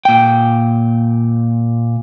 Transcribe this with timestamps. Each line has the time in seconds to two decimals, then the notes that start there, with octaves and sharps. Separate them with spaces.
0.05 A#2 G5